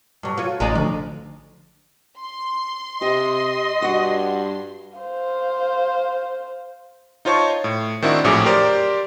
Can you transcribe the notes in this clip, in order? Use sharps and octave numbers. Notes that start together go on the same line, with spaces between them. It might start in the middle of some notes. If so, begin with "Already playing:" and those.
G2 F#3
F4 F#4 C#5
A1 G#3 D#4 D5
D2 D3 F3
C6
C3 G4 D#5
G2 F#4 F#5
C5 F5
D#4 F4 C5 C#5 A5 C#6
A2
D#3 C4 D4 E4 F#4
A#1 F2 A2 F#3 G#4 D6
G4 A#4 C5 D5